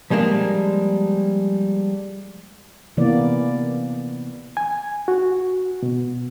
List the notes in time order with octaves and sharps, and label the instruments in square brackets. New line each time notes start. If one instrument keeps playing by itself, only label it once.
[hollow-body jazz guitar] F3 G3 G#3 A#3 D4
[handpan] C3 E3 A#3 B3 D5
[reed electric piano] G#5
F#4
B2